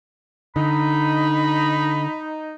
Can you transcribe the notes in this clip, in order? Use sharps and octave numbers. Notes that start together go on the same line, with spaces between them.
D3 D#4 B5